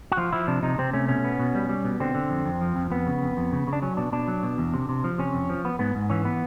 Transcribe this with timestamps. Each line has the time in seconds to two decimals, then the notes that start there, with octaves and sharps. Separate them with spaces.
0.12 F#4
0.17 F3 F4
0.32 F3 E4
0.47 C3 D4
0.63 C3 D#4
0.78 C3 C4
0.93 A3 C#4
1.08 B2 C#4
1.24 B3
1.40 B2
1.55 G3
1.69 G3
1.85 B2
2.00 D3 C4
2.15 D3
2.30 F2
2.45 F2
2.61 F3
2.76 F2
2.90 F2 B3
3.07 C#3
3.22 F2
3.37 F2
3.52 C#3
3.67 C#3
3.73 D4
3.82 F#3 C#4
3.97 B2 D4
4.12 B2 D4
4.28 F#3
4.43 B2
4.58 E2
4.74 C3
4.89 C3
5.04 F3
5.18 C3 C#4
5.34 F2
5.49 F3
5.65 B3
5.79 G#2 B3
5.95 G#2
6.10 E3 C#4
6.25 B3